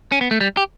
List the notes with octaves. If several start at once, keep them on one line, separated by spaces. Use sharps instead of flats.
C#4
B3
A3
G3
G4